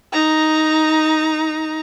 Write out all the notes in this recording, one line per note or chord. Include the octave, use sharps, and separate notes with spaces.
D#4 A#5